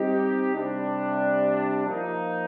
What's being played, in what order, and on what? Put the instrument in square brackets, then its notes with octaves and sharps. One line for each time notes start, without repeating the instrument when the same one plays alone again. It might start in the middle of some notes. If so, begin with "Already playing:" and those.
Already playing: [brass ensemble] G3 C4 D#4 G4
C3 G3 D4
F3 A#3 D#4